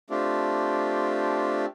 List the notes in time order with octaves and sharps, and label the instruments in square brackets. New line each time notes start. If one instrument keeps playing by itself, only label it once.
[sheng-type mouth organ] A3 C4 D4 F4 G4